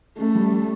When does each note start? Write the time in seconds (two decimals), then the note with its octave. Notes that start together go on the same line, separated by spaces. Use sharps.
0.18 A3 C#4
0.35 G3